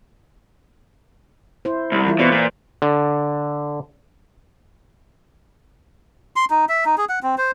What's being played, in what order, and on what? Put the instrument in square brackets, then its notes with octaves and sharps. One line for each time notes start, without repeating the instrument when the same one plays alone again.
[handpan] E4 C5
[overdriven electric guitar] C2
[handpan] E3 E4 F4
[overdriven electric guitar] B2 [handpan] E3 C5 D5
[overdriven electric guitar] A#2
[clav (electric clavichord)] D3
[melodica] C6
D#4
E5
D#4
G#4
F#5
C4
C5